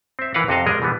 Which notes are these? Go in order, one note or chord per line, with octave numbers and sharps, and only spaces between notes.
C4 E5
E3 A#4 B4 F5 F#5
F2 C3 F#4 A4 D#5 F5
G3 G#3 G#4 A#4 D#5
B2 E3 G3 B3